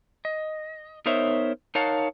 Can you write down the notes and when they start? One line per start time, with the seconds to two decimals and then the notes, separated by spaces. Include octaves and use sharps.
0.25 D#5
1.06 B3 D#4 A#4 C5 C#5 E5
1.75 D#4 A#4 C#5 F5 F#5 A5